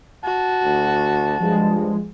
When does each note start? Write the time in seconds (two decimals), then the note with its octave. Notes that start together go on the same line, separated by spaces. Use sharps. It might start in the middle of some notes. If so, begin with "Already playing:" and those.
0.24 F#4 A5
0.65 D2
1.40 G2 F3 G#3